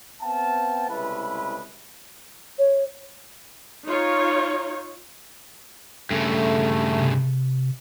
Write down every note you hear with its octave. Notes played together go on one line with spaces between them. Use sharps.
B3 C4 F5 G5 A5
C2 C#3 G#3 E4 A4 B4
C#5
D#4 F4 C#5
G2 C#3 A3
C3